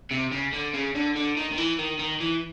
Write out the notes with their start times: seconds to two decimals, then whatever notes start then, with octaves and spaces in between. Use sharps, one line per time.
0.11 C3
0.31 C#3
0.53 D3
0.74 C#3
0.95 D3
1.15 D3
1.37 D#3
1.52 D#3
1.57 E3
1.79 D#3
1.99 D#3
2.21 E3